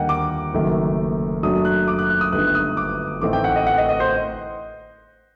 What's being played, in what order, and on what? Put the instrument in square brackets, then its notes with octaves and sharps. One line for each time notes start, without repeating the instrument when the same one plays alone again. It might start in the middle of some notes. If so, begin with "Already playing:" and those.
Already playing: [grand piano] D#2 D3 G3 A#3 D#5 F#5 G5
D6
F#1 F#2 D#3 A3
F#2 F#3 A3 D4 D#6
F#6
D6
F#6
F#6
D#6
G1 G2 D3 A3 D#4 F#6
F#6
D#6
D6
A1 A2 A3 C4 D#4 D6
G5
F#5
D#5
F#5
D#5
D#5
C5